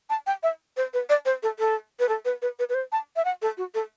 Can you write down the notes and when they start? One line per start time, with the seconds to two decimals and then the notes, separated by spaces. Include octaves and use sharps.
0.09 A5
0.27 G5
0.43 E5
0.77 C5
0.93 B4
1.09 D5
1.25 C5
1.43 A4
1.59 A4
1.99 B4
2.09 A4
2.25 B4
2.42 B4
2.59 B4
2.69 B4
2.74 C5
2.92 A5
3.16 E5
3.25 F#5
3.42 A4
3.57 F#4
3.74 A4